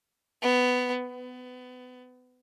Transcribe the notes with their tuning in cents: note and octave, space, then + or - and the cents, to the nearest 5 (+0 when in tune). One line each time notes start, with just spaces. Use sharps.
B3 +15
B3 +25